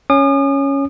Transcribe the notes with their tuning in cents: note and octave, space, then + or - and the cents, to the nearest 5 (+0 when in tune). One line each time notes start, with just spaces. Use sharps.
C#4 +0 D#6 -40